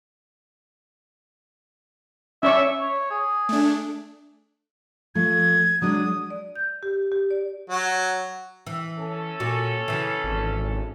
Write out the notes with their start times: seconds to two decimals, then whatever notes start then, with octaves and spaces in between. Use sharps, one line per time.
2.43 C#4 D5 E5 C#6
2.80 C#5
3.11 G#4
3.49 A3 D4
5.15 F3 A3 G#6
5.82 F#3 G#3 D4 D#6
6.30 D5
6.55 G6
6.83 G4
7.12 G4
7.30 D5
7.70 F#3
8.66 E3
8.98 C#4 A4
9.40 A#2 F#4
9.88 C#3 E3
10.24 G#1